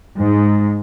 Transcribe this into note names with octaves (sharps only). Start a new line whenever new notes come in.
G#2